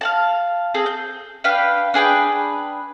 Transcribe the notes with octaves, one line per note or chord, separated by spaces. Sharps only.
F5 F#5 A5
C4 G#4 A4
G6
D4 B4 F5 G5
D4 G#4 B4 G5